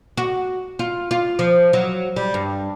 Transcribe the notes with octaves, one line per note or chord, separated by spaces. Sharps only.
F#4
F4
F4
F3
F#3
G3
G2